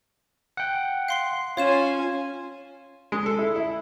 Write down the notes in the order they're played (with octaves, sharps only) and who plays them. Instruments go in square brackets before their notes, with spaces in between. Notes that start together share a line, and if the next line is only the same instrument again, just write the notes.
[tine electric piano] F#5 G5
[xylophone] F5 C6 C7
[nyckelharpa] C#4 G#5 [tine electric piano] F4 [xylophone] C#5 F5 E7
[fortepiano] G#3
A4
E4
E4